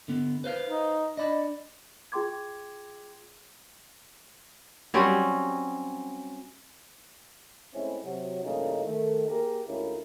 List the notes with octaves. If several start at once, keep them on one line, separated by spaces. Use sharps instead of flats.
D3 B3
B4 C5 F5
D#4
D4 D#5 B5
F4 G#4 G5 C6 D6 G#6
F#3 G3 C4 C#4
A2 G#3 C4 C#4 E4
C3 F#3
A1 G2 A#2 C#3 A3 D#4
D#3 A3
A#3 G4 G#4 A#4
D2 G#3 C#4 E4 F4 A#4